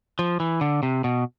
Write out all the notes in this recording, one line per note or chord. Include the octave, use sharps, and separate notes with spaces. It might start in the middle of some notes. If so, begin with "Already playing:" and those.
F3
E3
D3
C3
B2